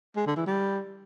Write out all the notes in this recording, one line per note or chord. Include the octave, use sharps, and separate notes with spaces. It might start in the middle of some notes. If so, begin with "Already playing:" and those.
G#3
D3
E3
G3